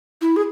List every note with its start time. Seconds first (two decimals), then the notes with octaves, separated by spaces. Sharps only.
0.21 E4
0.36 G#4